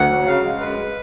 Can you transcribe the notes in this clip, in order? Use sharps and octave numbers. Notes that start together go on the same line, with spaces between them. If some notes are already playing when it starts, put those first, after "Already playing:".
Already playing: D2 F#5
F#3
C#3 F5
G#3
F#2 B4